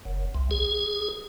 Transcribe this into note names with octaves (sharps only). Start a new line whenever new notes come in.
F#1
C2
G#4